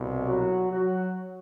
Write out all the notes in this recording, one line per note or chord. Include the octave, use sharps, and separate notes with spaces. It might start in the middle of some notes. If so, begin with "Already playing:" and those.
Already playing: C2 B2
F#3 F#4
F#3 F#4